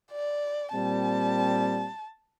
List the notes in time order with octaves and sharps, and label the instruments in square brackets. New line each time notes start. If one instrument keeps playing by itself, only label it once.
[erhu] D5
[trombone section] A#2 G3 C4 [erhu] A5